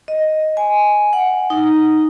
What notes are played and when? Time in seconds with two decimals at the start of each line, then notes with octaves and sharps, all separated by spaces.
0.08 D#5
0.57 G#5
1.13 F#5
1.50 D#4